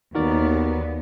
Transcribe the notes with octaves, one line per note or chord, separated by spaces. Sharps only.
D#2 B3 D#4 F#4 A#4 D5